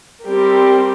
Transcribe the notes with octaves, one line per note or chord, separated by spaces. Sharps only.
G3 C4 G4 A#4